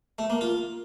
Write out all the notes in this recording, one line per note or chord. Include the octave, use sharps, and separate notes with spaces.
A3
A#3
F4